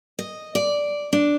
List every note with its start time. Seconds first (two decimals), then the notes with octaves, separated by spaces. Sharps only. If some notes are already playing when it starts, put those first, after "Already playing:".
0.19 D#5
0.55 D5
1.13 D4